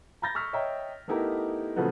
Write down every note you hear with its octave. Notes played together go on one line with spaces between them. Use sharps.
A#5 B5 G6 A6 A#6
C#6 E6 F6 B6
C#5 D#5 E5 G5 A#5
A3 B3 D#4 E4 G4 A#4
A#2 C#3 F3 F#3 A3 B3